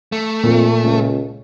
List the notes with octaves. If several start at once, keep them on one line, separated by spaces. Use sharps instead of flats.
A3
F2 A#2
C#2